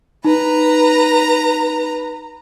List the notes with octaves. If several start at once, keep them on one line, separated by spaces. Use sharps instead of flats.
D#4 B4 A#5